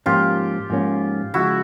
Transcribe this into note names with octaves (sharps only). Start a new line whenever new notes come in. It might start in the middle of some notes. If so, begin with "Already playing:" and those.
G#2 F3 A#3 C#4 F4 G4
G#2 F3 A#3 C#4
C#3 F3 G#3 E4 F#4